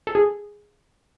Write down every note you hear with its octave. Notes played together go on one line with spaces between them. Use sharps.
A4
G#4